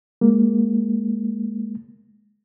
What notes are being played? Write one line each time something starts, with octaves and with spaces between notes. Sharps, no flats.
G#3 A#3